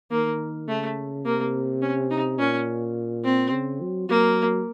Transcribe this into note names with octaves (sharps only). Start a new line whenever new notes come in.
D#3 A#3
C#3 A3
C3 A#3
C#4
D#4
A#2 C#4
C4
C#3
F#3
F#3 A#3